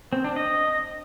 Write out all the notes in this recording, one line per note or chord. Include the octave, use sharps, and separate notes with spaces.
C4
D4
D#5